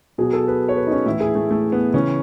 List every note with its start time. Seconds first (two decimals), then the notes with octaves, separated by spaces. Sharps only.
0.18 B2 F#3 G#4
0.33 A4
0.48 B4
0.69 C#5
0.77 B4
0.87 D#4
0.91 C#4
1.06 A2 E3 E4
1.20 G#4
1.35 A3
1.51 A3
1.72 B3
1.94 C#3 E3 C#4